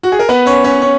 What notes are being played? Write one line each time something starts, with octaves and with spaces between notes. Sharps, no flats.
F#4
G#4
A#4
B3 B4
C#4 C#5
C#4 C#5
C#4 C#5